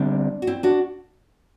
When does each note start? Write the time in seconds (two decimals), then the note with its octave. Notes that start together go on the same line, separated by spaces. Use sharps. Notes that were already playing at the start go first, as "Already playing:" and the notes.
Already playing: D3 G3 B3 C4 D4
0.42 F#4
0.47 C4 E4
0.63 D4 F#4